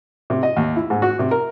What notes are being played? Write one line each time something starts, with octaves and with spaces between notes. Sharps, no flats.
C3
D#5
D#2
E4
G#2
F#4
C3
A#4